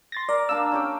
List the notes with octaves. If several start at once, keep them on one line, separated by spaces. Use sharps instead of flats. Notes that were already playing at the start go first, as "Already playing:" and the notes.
C6 A6 A#6
A#4 D5
A#3 D4 F5 E6
C#4 G4 G5